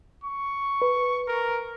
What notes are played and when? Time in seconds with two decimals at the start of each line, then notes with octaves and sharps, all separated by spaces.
0.24 C#6
0.82 B4
1.27 A#4